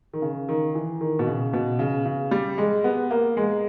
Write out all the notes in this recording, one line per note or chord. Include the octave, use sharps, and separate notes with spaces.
D#3
C#3
D#3
E3
D#3
B2
C#3
B2
C#3
C#3
G3
G#3
B3
A#3
G#3